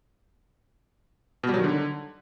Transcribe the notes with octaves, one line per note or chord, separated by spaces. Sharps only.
B2
G3
F#3
D#3
D3